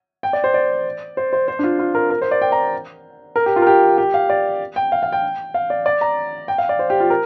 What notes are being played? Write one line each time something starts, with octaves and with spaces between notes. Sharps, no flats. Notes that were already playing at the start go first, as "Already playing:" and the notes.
G5
D5
C5
D5
C5
C5
C5
D4
F4
F4
A#4
A#4
C5
D5
G5
A#5
A#4
G4
F4
A#4
G4
G4
F5
D5
G5
F5
F5
G5
F5
D5
D5
A#5
G5
F5
D5
C5
G4
F4
A#4